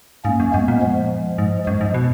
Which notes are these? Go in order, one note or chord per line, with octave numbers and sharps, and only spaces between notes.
G#2 A#3 C#4
F#2
F#2 G#3 B3
A#2
F3 G#3
G#2
F#2 F3 G#3
G#2
B2